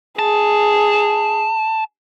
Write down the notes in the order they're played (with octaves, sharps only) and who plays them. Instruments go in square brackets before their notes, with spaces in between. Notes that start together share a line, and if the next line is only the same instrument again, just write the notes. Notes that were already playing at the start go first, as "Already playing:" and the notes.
[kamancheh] G#4 [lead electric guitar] A5